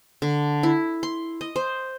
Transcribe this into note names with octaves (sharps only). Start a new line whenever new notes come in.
D3
E4
C6
D#5
C5